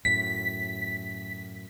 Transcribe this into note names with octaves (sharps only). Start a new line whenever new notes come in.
F#2 A2 B6